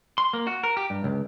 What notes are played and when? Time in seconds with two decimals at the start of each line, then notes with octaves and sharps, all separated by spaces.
0.18 C6
0.33 A#3
0.47 F#4
0.63 A#4
0.77 G4
0.90 G2
1.04 C#2